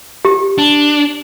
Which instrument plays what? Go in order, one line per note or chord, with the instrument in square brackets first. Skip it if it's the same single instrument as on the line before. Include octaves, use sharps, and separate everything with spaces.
[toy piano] G4
[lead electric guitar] D4